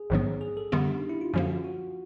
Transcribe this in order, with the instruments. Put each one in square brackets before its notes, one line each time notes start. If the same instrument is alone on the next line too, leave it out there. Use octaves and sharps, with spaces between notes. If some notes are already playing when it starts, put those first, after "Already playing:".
Already playing: [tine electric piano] G#4
[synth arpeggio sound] A#1 G#2 D#3 F#3 B3
[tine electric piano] G#4
A4
[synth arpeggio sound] F#2 D3 G3 B3 [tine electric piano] G4
[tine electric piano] D4
D#4
E4
F4
[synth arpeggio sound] F#2 D3 F3 A#3 [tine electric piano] F#4
[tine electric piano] F4
F#4